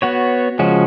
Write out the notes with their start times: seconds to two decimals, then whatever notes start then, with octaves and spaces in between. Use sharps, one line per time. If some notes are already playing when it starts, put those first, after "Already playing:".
0.02 B3 F#4 C#5
0.59 C#3 F3 G#3 C#4 F#4